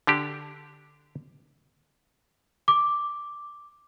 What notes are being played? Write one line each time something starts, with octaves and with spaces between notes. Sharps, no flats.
D3 D4 G4
D6